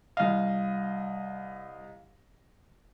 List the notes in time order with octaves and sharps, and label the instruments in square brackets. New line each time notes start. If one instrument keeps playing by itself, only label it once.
[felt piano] C2 D#5 [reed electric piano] F5